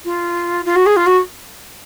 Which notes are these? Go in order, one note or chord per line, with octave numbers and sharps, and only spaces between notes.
F4
F4
F#4
G#4
F4
F#4